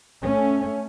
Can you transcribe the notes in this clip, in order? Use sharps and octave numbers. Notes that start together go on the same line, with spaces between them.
A3 C#4